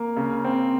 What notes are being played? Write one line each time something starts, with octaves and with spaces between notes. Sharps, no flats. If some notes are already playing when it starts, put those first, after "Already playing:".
Already playing: A#3
C#3
C4